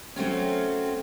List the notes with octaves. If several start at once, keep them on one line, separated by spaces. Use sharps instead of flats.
F#3 A3 C4 C#4